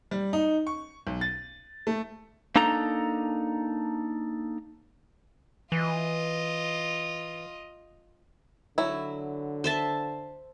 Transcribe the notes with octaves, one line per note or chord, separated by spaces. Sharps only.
G3
D#4
C#6
B1
A6
A3
A#3 D4 D#4 A4 A#5
E3 F4 D#5
D3 F#3 E4
C5 E5 A5